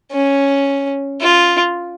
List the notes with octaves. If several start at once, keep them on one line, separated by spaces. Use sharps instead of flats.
C#4
F4